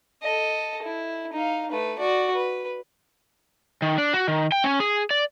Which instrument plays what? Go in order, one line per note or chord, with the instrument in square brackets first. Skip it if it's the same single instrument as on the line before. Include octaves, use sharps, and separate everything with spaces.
[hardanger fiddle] A4 D#5
E4
D#4 F5
A3 B4
F#4 D5
B4
[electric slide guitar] D#3
D4
F#4
D#3
G5
C#4
G#4
D5